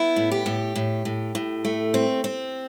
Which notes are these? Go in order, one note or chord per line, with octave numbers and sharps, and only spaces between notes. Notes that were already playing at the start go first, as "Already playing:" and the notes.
Already playing: B3 E4
A2
G4
A2
A2
A2
A2
A3
C4
C4